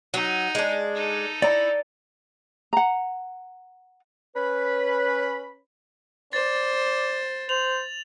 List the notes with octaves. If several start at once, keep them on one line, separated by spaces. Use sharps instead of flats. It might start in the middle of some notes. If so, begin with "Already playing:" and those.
F#3 D#4
G#3 D4
D#4 A4
E4 D5 A#5
F#5 A#5
C#4 B4 B5
C5 D5 A6
C5 F7 F#7